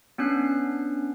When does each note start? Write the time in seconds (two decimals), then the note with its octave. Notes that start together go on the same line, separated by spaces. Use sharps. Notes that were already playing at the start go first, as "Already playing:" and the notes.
0.18 B3 C#4 D4 F#6 C7